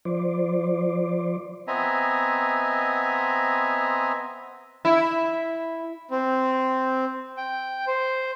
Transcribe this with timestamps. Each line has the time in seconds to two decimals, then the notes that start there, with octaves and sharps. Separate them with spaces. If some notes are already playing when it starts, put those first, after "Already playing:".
0.05 F3 C5 D5
1.68 B3 C4 D#5 E5 G#5 A#5
4.85 E4
6.11 C4
7.37 G5
7.87 C5